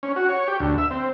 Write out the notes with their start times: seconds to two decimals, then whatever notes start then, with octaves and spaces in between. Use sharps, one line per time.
0.03 C#4
0.16 F#4
0.29 C#5
0.48 G4
0.60 D2
0.78 E5
0.91 C4